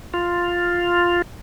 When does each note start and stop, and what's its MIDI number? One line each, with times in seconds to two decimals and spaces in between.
0.14 1.22 65